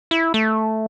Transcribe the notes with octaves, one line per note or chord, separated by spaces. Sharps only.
E4
A3